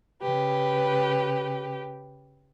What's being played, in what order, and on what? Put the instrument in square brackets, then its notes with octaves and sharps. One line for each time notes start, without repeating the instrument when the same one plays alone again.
[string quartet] C#3 G4 B4